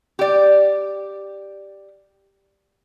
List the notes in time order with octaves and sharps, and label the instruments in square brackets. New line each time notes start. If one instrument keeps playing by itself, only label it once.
[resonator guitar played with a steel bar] G4 D5